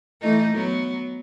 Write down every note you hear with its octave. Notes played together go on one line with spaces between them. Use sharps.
E3 A3 D#4
F#3 B3